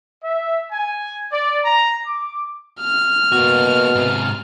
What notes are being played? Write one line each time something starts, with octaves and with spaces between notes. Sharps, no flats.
E5
G#5
D5
A#5
D6
F6
B2 A#3 F#4
G#2 C3